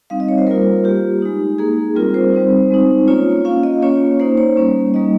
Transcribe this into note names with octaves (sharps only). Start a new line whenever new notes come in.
G3 C4 D#4 F5
D#5
C#5
C5
G3 A#3 F4 A#4
A#3 F4 G4
G#3 D#4
A#3 D#4 G#4
G3 C4 F4 A#4
C5
G3 C4 D#4
G#3 C4 D#4
A#3 C#4 F4 C#5
A#3 C#4 F4 F5
D#5
A#3 C#4 F4 C#5
A#3 D#4 C5
C#5
G3 A#3 C#4
G3 A#3 D#4 D#5